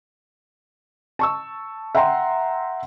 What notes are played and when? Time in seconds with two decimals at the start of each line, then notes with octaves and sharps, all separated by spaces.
1.19 A5 C#6 E6
1.95 E5 F#5 G5 A#5 C6